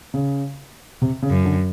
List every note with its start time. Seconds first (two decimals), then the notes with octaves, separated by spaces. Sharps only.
0.14 C#3
1.02 C3
1.22 C#3
1.30 F#2
1.45 D3